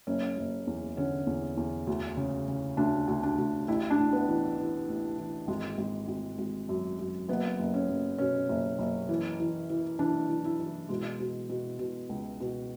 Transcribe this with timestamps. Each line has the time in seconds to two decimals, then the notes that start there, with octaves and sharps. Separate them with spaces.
0.07 F#1 C#4
0.37 F#1
0.67 E2
0.97 D3 C#4
1.27 E2
1.57 E2
1.87 D2
2.17 C#3
2.48 C#3
2.77 D2 D4
3.08 D2
3.23 D4
3.38 D2
3.68 A1 E4
3.90 D4
3.99 A2
4.13 B3
4.28 E3
4.58 E3
4.88 A1
5.18 E3
5.48 G#1 G#3
5.78 G#1
6.08 G#1
6.38 G#1
6.69 F#2
6.99 F#2
7.29 F#1 B3
7.59 F#1
7.74 C#4
7.89 F#1
8.19 B2 C#4
8.49 F#1
8.79 F#1
9.09 E3
9.40 E3
9.70 E3
9.99 E3 D4
10.30 E3
10.45 E4
10.59 E3
10.89 B2 G#3
11.20 B2
11.50 B2
11.79 B2
12.09 C#2
12.40 B2